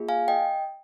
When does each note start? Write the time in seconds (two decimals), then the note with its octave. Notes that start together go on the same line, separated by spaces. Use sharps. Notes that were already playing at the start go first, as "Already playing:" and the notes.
Already playing: A#3 F4 G#4
0.09 F5 G#5
0.28 D#5 G5